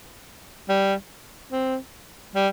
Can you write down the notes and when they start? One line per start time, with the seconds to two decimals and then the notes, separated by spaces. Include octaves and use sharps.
0.69 G3
1.52 C4
2.35 G3